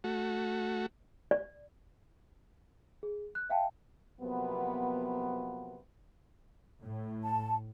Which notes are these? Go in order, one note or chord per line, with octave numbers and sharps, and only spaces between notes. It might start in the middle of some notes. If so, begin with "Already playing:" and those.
A3 F#4
D5
G#4
F#6
E5 F5 G5 A5
C3 F3 F#3 A#3 B3
A2
A5